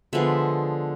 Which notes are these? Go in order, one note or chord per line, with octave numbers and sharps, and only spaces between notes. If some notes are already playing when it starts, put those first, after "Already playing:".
D3 F3 G#3 B3 E5